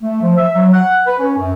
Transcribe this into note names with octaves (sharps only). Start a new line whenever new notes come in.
A3
F3
E5
F#3
F#5
B4
C#4
F#2